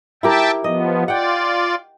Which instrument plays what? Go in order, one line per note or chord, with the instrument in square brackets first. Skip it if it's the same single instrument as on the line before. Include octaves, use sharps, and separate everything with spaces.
[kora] E4 G4 A#4 [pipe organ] E5 G5 A5
[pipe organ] F3 B3 [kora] D#5
[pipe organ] F4 D5 [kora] F#5 G5